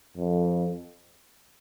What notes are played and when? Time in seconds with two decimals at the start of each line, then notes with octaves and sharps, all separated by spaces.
0.17 F2